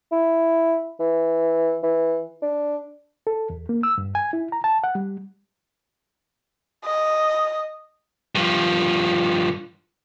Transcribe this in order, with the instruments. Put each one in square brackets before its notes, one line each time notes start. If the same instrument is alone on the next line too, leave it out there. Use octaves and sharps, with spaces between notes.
[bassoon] E4
E3
E3
D4
[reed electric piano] A4
E2
A#3
E6
G2
G#5
E4
A#5
A5
F#5
G3
[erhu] D#5
[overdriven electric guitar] G2 F3